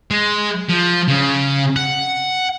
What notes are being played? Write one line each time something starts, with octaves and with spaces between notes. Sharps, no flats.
G#3
F3
C#3
F#5